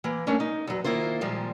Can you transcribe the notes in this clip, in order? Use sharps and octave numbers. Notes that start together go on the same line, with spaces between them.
E3 A#3
G3 A3 A#3 C#4 D4
D#4
E2 F#3
D#3 A#3 E4 F4 C5
A#2 D#3 F3 G3 G#3